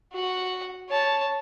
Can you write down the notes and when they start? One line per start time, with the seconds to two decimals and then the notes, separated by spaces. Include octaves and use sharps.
0.13 F#4 F#5
0.89 C#5 A5